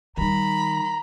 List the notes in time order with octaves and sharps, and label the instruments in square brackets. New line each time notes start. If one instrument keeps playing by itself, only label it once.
[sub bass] D#3 [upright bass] G3 D#4 [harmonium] A#5 [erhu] B5